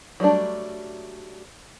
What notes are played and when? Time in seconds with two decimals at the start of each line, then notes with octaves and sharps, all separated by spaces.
0.20 F#3 G3 A3 D4